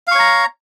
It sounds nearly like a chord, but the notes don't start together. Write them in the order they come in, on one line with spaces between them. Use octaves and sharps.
F5 C#6 C#5 A#5